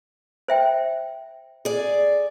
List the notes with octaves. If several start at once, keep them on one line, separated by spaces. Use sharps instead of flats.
C5 E5 G5
G#4 D5